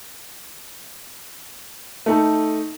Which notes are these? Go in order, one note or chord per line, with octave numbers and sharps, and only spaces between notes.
A3 D#4 A4